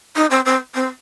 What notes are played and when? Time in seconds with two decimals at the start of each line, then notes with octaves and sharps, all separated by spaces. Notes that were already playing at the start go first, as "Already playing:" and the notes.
0.16 D#4
0.30 C4
0.45 C4
0.74 C4